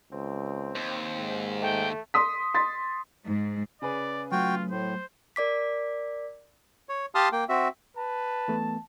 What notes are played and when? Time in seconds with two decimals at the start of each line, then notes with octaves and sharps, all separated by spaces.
0.12 C#2 C4
0.75 D#2
1.17 G#2
1.62 A3 G5
2.14 C6 D#6 B6
2.54 C6 A6 B6
3.25 G#2
3.82 C#3 G#4 B4 D5
4.32 F#3 A3 F4 F#4 G5
4.71 A2 C5
5.36 A#4 D5 D6 B6
6.89 C#5
7.15 G4 F5 A5 C6 D#6 F6
7.32 A#3 G5
7.49 C4 F#4 E5
7.97 B4 A5
8.48 E3 A3 B3